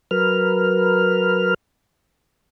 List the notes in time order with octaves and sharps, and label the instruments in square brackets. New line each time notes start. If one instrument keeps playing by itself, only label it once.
[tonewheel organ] F#3 A#4 B4 F6